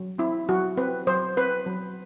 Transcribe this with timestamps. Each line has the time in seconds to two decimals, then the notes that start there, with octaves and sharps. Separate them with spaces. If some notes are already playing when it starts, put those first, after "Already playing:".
Already playing: F#3
0.18 C4 E4
0.49 F#3 F#4
0.77 C4 B4
1.07 F#3 C5
1.37 C4 B4
1.66 F#3